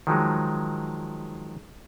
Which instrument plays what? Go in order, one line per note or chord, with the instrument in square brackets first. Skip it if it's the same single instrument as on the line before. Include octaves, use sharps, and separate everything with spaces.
[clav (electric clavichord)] D#3 F3 F#3 G#3